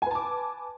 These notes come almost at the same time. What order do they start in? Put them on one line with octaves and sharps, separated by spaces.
G#5 B4 A5 D6